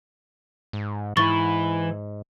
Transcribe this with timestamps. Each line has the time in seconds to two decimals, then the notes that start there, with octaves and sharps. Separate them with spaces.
0.73 G#2
1.17 G#2 E3 E4 C#6 A6 G7